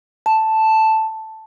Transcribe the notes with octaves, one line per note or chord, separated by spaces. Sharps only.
A5